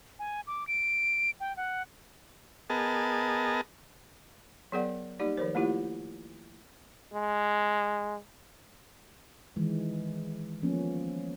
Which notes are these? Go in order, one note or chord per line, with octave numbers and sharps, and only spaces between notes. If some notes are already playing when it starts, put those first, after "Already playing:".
G#5
D6
D7
G5
F#5
B3 G#4 A#4 D#5 A5
F#3 B3 G#4 A#4 D5 F#5
G3 A#3 D#4 G4 D5
D#3 F3 A#4 C5
A3 A#3 E4 F4 G4
G#3
D#3 E3 G#3
F3 A#3 B3 C#4